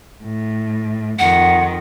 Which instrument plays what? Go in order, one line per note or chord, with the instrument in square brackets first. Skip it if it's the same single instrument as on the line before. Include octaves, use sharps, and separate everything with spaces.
[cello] A2
[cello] F2 D#3 [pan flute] F#5